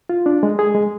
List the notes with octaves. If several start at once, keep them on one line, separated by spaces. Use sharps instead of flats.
F4
D4
G#3
G#4
G#3